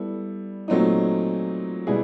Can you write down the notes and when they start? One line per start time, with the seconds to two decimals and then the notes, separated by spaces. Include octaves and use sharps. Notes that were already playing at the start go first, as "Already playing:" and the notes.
Already playing: G3 B3 E4 A4
0.68 A#2 F#3 A3 C4 D#4
1.87 B2 G3 B3 E4 G#4